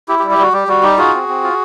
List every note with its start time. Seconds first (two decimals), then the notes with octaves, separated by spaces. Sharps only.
0.08 E4 G4
0.19 G4
0.24 G3
0.31 G4
0.38 G3 F#4
0.53 G3 G4
0.68 G3 F#4
0.83 D#4 G4
0.98 F4 F#4 G#4
1.14 C4
1.28 C4
1.44 F4